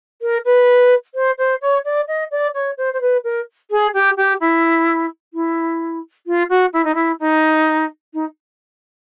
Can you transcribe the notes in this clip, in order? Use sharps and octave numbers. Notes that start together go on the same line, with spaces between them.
A#4
B4
C5
C5
C#5
D5
D#5
D5
C#5
C5
C5
B4
A#4
G#4
G4
G4
E4
E4
F4
F#4
E4
D#4
E4
D#4
D#4